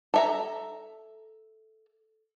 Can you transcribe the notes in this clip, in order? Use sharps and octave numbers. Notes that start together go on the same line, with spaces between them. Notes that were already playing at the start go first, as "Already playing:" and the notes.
A4 E5 A#5